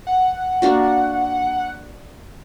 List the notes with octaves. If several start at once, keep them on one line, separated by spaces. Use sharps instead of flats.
F#5
A#3 D4 F#4